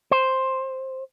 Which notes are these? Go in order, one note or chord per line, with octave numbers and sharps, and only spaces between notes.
C5